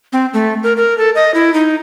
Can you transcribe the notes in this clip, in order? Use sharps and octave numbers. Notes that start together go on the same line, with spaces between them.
C4
A3
A#4
A#4
A4
D#5
E4
D#4